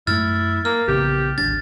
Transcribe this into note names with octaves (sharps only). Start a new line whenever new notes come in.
F#2 A3 E4 F6 A6
A#3 F6
A#1 C#3 B3 G4
D1 G#1 D4 A6